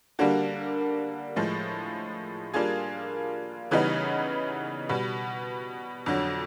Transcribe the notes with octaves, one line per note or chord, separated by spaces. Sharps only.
D3 G3 A#3 D4 F#4
A2 F3 G#3
G3 A#3 D4 F4 G#4
C#3 E3 G3 B3 D#4
B2 G3 B3
F2 D3 F#3